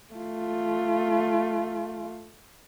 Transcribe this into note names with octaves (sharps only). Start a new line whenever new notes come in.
A3 F4